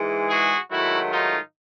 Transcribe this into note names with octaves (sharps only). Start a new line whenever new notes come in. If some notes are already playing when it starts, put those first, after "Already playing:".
Already playing: G#2 E3 G#3
F#4 G#4
G#2 D#3 F#3 A3 E4 F#4
D#4 F4